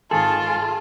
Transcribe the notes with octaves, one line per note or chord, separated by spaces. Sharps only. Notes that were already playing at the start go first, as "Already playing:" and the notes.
G#1 D#3 F4 G#4 A4 A5